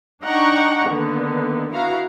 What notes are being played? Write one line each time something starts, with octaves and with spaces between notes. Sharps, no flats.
D4 D#4 F#5 G5 A#5 C#6
D3 D#3 A#3 B3
B3 E4 F#4 F5 A#5